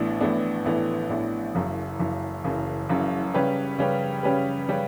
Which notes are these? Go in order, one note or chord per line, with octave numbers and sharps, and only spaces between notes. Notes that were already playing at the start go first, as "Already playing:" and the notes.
Already playing: A1 A2 E3 B3 D4
A1 A2 E3 B3 D4
A1 A2 E3 B3 D4
A1 A2 E3 B3 D4
F#1 F#2 C#3 E3
F#1 F#2 C#3 E3
F#1 F#2 C#3 E3
F#1 F#2 C#3 E3
C#3 G3 C#4 G4 B4
C#3 G3 C#4 G4 B4
C#3 G3 C#4 G4 B4
C#3 G3 C#4 G4 B4